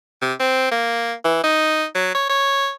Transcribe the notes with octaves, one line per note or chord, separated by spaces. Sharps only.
C3
C4
A#3
E3
D#4
F#3
C#5
C#5